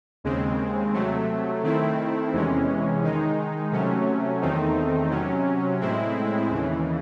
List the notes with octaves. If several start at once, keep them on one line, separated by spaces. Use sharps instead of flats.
D#2 C#3 G#3 C4
C3 F#3 A3
D#3 A3 C4 E4
E2 C3 E3 G#3 C#4
D#3 G#3 D#4
C3 F#3 A3 C#4
E2 D#3 A3 C4 D#4
C3 F#3 C#4
A2 G#3 C4 E4
D#2 C#3 E3